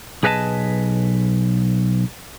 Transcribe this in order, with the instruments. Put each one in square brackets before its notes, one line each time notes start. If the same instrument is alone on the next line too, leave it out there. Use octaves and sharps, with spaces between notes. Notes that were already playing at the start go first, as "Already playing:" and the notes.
[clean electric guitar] B1 G#4 B4 D#5 F5 A5